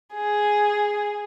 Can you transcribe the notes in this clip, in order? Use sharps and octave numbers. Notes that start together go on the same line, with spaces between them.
G#4